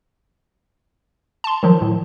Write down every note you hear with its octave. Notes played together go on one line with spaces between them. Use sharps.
A5 C6
D#3 F3 F#3
A2